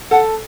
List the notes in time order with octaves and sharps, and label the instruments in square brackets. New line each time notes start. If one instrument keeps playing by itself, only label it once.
[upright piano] A4 [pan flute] F#5